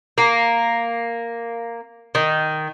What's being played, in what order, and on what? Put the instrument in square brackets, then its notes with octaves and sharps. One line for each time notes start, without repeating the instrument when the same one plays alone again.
[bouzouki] A#3
D#3